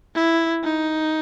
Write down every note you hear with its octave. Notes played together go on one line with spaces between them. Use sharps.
E4
D#4